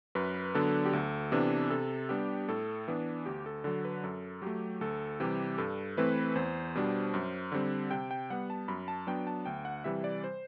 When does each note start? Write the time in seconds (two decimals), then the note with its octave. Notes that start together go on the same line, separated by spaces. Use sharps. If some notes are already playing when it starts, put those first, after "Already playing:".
0.15 F#2 B4
0.55 D3 F#3 B3 D4 A4
0.86 G4
0.93 D2 A4
1.32 C3 E3 B3 D4
1.70 C3 A4
2.09 G3 B3 D4 G4
2.48 A2 A4
2.88 E3 B3 D4
3.26 D2 G4
3.46 A4
3.64 D3 F#3 A4
3.85 B4
4.03 F#2 A4
4.42 F#3 A3 G4
4.81 D2 A4
5.20 C3 E3 G3 G4
5.58 G2 A4
5.97 E3 A3 C4 B4
6.35 E2 C5
6.75 B2 G3 D4
7.14 F#2
7.52 D3 G3 C4
7.91 C3 G5
8.11 G5
8.30 G3 B3 F#5
8.50 A5
8.68 F#2 B5
8.88 A5
9.07 F#3 B3 D4 G5
9.27 A5
9.46 D2 G5
9.65 F#5
9.84 C3 E3 G3 E5
10.04 D5
10.24 C5